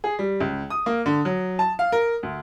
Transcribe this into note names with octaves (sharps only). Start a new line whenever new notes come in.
G#4
G3
C#2
D#6
A#3
D3
F#3
A5
F5
A#4
D2